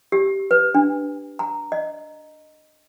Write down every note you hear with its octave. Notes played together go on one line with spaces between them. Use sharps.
G4
B4
D4
A#5
D#5